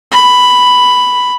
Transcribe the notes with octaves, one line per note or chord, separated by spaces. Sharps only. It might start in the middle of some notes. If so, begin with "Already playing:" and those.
B5